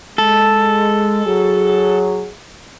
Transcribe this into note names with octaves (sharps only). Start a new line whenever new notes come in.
G#3 A4
F#3 G#4